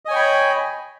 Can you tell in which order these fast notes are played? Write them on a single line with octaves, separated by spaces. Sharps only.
D#5 G#5 C#5 G5 B5